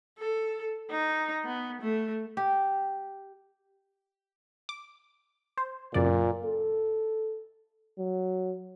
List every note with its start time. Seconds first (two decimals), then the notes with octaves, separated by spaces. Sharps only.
0.18 A4
0.90 D#4
1.44 B3
1.81 A3
2.37 G4
4.69 D6
5.57 C5
5.94 F#2 A#2 C#3 D5
6.46 A4
7.99 F#3